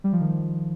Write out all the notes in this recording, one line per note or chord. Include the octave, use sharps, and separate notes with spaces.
G3
F3
D#3